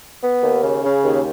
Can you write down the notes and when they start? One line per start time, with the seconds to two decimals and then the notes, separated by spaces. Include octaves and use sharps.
0.22 B3
0.42 D#2
0.63 C#3
0.84 C#3
1.04 D#2